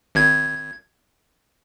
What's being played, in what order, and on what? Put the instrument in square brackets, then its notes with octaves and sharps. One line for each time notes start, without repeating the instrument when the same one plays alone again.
[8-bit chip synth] G#1 G#6